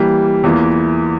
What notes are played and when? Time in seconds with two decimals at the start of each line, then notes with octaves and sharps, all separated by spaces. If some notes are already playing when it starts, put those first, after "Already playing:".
Already playing: E3 G3 A#3
0.44 E2 E3 A#3 F4